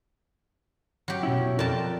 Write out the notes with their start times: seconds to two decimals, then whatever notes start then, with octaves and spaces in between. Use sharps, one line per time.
1.08 F#3 G4
1.23 B2 C#4 E4
1.59 F2 A#4 D5 G5 A5